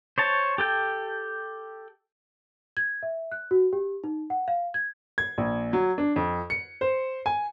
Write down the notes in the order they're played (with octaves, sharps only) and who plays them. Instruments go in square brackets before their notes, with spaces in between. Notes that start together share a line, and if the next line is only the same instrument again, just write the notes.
[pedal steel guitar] C5 C#5 A5
G4 A4 G5
[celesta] G#6
E5
F#6
F#4
G4
D#4
F#5
F5
G#6
[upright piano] G#6
A#1
F#3
D4
F2
C#7
C5
G#5